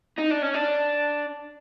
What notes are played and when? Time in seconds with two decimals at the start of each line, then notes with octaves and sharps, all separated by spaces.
0.18 D#4
0.30 D4
0.42 C#4
0.54 D4